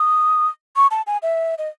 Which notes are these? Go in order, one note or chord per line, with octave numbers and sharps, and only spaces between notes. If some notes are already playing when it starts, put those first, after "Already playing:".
Already playing: D#6
C#6
A5
G#5
E5
D#5